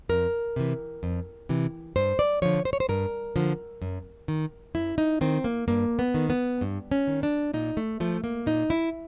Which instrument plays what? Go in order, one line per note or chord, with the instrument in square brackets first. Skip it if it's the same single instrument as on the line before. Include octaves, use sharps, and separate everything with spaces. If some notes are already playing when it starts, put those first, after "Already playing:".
[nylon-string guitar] F2 A#4
C3 E3
F2
C3 E3
G2 C5
D5
D3 F3 C#5
C5
C#5
C5
G2 A#4
D3 F3
F#2
D#3
F#2 E4
D#4
D#3 C4
A#3
G2 A#3
B3
D#3
B3
G2
C#4
D#3
D4
A#2 D#4
A3
F3 A3
A#3
A#2 D#4
E4